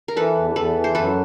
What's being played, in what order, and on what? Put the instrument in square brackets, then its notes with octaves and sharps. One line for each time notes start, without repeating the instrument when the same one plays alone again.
[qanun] A#4
[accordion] E3 [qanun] A4 B4
[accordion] E2
[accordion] E2 [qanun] A4 B4
[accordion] E3
[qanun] C5
[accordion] F#2 [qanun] A4 B4